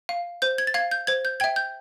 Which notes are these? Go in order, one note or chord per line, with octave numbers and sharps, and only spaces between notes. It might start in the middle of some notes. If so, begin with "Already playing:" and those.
F5
C5 G6
G#6
A6
F5 G#6
G6
C5 G#6
G6
E5 G5 G#6
G6